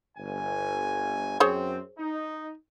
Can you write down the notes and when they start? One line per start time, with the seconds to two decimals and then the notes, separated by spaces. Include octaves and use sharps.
0.18 G1 G#5
1.40 F#2 C4 G#4 C5 C#5
1.98 D#4